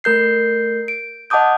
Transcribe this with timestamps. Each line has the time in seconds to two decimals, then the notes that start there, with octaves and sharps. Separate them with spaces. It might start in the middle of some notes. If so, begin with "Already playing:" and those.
0.04 A3 A#4 G6 C7
0.88 D7
1.30 D#5 F#5 A5 D6 D#6 G6